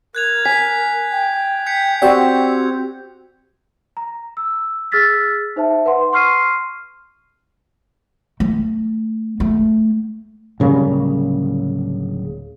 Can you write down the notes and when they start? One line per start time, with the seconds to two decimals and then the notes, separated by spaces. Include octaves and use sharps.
0.15 A#4 F#6 G#6 F7
0.45 G#5 B6
1.12 G5
1.67 G6 B6 C#7
2.02 C4 F#4 G4 D5 F#5 E6
3.97 A#5
4.37 E6
4.92 G#4 E6 F6 A6 B6
5.56 D#4 C5 E5 A5
5.86 B4 F#5 C6
6.13 C6 C#6 F6 C7 D#7
8.40 A3
9.40 A3
10.60 D1 C#3 G3 A#3